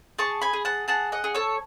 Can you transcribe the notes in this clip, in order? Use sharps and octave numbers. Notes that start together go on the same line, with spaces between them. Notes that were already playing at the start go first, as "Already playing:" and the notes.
G#4 A5 C#6
G#5 B5
G#4
F#5 A5
G#4 F#5 A5
D#5 F#5
G#4
A4 C#5